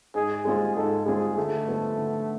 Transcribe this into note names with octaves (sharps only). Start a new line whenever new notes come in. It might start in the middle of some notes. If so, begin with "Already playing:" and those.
G#2 G#4
G#3 C4 F4 G#4
G#2 A4
G#3 C4 F4 G#4
D3 A3
F3 B3
D3